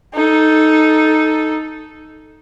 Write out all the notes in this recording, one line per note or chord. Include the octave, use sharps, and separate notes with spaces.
D#4 A4